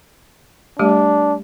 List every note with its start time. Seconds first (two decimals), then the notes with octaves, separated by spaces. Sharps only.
0.79 G3 A3 D4 G4